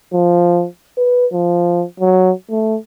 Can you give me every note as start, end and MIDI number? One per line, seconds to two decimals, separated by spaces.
0.14 0.66 53
0.98 1.26 71
1.33 1.84 53
2.00 2.32 54
2.50 2.77 57